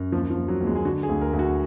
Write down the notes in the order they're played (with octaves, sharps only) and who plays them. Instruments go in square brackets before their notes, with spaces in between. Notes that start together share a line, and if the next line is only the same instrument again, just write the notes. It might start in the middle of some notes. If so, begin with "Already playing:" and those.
Already playing: [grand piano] F#2
D#2 F3
F3
D#2
F#3
D#2
G#3
G#4
D3 F#4
G#4
D2
A#4
D2
F#4